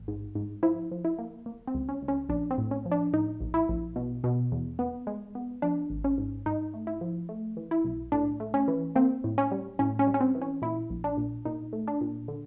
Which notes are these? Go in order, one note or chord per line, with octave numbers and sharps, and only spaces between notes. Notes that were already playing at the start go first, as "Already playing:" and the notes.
Already playing: A1
G#2
G#2
F3 E4
F3
E4
A#3
A#3
C4
C#2
C#4
C#2
C#4
A#1 D4
C4
A2
C#4
F3
D4
A2 D#4
A#1
E4
A#1
B2
B2
E2
B3
G#3
B3
F3 D4
G#1
C#4
G#2
G#2 D#4
A3
E4
F3
A3
E3
E4
B1
A2 D4
A3
C#4
E3
A#3 C4
A2
C#4
G3
A2 C#4
C#4
G3
C#4
C4
E3
C#4
A#2 E4
A#1
D4
A#2
A#2 D#4
A3
D4
A#2
D3